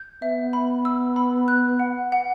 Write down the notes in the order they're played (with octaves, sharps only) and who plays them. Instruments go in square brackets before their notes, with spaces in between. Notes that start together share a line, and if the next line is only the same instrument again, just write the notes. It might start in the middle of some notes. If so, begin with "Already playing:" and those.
Already playing: [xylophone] G6
[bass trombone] B3 [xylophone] E5
[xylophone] B5
E6
B5
F#6
F#5
F#5